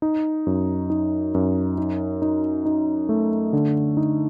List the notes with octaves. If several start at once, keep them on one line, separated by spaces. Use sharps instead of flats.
D#4
F#2
D#4
F#2
D#4
D#4
D#4
A3
D3
D#4